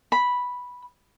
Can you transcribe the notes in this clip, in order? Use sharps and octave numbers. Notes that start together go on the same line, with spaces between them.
B5